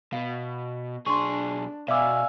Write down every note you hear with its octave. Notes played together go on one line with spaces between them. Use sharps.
B2 F5
B1 D4 G#4 C6 C#6
B2 D5 E5 F5 G#5 D6 E6